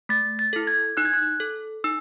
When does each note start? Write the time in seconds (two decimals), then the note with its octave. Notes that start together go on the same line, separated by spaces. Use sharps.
0.09 A3 A6
0.39 A6
0.53 E4 A4
0.67 G#6
0.97 D#4 F#6
1.05 G#6
1.14 F#6
1.40 A4
1.84 D#4 E6